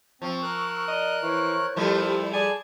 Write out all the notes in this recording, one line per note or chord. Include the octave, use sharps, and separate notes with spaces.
F3 C4 C#6 E6
A#4 F#6
D5 D#5
E3 C5 C#5 C#6
F3 G3 A3 E4 G4 A#4 C5
G#4 D5 G#5 A5 G#6